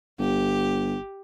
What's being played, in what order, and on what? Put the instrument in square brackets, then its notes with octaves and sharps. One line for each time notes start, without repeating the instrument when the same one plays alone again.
[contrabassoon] G1 [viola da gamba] G4